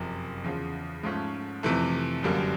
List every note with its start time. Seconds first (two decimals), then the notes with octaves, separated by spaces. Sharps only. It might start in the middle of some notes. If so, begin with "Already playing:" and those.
Already playing: F#1 F2 C3
0.44 E2 C#3 F3
1.03 G#2 F3 A3 C#4
1.63 F2 C3 E3 A3
2.23 G1 F#2 D3 G3 A#3